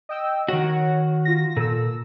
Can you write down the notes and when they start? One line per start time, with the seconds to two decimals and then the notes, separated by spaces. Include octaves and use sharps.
0.09 D#5 G5 E6
0.48 D#3 F#4 C#5 F#5
1.25 F4 A#6
1.57 A#2 A4 E6